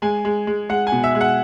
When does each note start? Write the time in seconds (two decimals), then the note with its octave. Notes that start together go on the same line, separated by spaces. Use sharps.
0.02 G#3 G#5
0.25 G#3
0.47 G#3
0.69 G#3 F#5
0.87 G#5
0.92 B2
1.04 E5
1.15 G#3
1.21 F#5